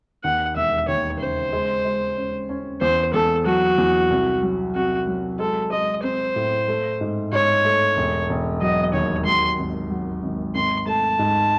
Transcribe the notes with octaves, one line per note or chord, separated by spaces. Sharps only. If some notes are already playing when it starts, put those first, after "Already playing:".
D#2 F#5
E1 E5
D#2 C#5
C#3 C5
G#3
G#3
C#4
C#4
E2 C5
E2 A4
F#3 F#4
E2
C2
F#3
C3 F#4
F#3
G#3 A4
G#3 D#5
C4 C5
A2
A3
G#2
G#2 C#5
A3
E1
E1
F#3 D#5
D#2 C#5
F#3 C6
G#1
F#3
G#1
G#1 C6
A3 A5
G#2